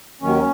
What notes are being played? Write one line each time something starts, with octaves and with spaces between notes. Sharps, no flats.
D#2 D#3 F#3 C#4